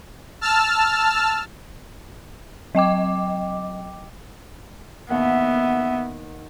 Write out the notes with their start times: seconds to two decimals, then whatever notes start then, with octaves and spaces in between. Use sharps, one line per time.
0.41 A5 E6 F6
2.75 F#3 D#5 G5 D6
5.10 D#2 B3 E5 F#5